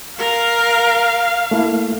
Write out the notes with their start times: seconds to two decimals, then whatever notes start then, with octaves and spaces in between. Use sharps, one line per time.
0.18 A#4 F5
1.51 A3 A#3 E4